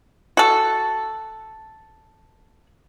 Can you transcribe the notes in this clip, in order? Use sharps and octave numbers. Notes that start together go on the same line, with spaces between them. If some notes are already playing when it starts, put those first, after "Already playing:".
F#4 A4